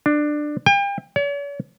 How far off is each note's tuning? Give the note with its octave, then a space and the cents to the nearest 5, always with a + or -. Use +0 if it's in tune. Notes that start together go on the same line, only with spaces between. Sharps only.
D4 +15
G5 +40
C#5 +45